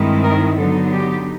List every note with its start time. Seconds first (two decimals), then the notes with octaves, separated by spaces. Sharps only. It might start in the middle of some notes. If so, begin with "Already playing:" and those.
Already playing: G2 D#3 G#3 C4 E4
0.23 A#4
0.57 D3 F#3 B3 D#4 A4
0.93 G4